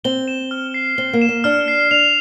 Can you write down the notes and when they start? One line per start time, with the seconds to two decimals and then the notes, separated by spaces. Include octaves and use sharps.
0.04 C4 G7
0.28 E7
0.51 F6
0.74 C7
0.98 C4 G7
1.13 A#3
1.22 E7
1.29 A#3
1.44 D4 F6
1.68 C7
1.91 D4 F7